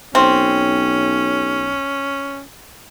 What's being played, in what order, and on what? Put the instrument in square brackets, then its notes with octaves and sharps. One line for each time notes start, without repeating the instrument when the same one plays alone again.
[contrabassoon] B1 [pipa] C4 [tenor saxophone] C#4